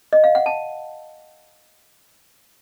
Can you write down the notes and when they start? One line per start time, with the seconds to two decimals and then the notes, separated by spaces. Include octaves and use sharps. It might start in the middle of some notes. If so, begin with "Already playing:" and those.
0.13 D#5
0.24 F5
0.35 F#5
0.46 A5